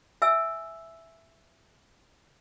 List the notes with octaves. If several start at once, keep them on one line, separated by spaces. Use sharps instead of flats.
E5 G#5 E6